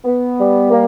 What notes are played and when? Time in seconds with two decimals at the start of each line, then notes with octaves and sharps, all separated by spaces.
0.05 B3
0.39 G3
0.71 A#3